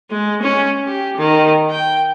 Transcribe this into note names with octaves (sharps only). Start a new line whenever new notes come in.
G#3
C#4
G4
D#3
G5